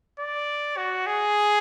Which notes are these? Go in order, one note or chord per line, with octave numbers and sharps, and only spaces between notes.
D5
F#4
G#4